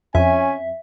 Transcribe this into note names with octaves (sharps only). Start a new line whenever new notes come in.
F2 C#4 E5 G#5